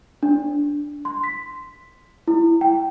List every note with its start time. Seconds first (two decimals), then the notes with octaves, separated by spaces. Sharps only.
0.23 D4
1.05 C6
1.24 B6
2.28 E4
2.61 G5